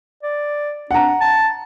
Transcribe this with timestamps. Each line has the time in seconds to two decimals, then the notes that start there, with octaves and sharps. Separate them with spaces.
0.23 D5
0.91 D4 F#5 A#5
1.21 A5